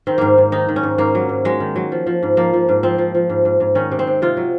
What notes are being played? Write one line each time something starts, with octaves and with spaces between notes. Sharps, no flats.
D#3 C4
G#2 A#3
G#2
D#3 D#4
D#3
C#4
G#2
G#2 A#3
F#3
G#2
F#3 G#3
D#3
F#3
F3
F3
G#2
F3 A#3
F3
G#2
F3 C4
F3
F3
G#2
G#2
G#2
D#3 C#4
C3
C4
C3
C3 F4
F#3